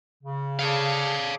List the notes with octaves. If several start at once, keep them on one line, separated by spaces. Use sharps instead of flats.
C#3
G#4 A4 C#5 D5 F5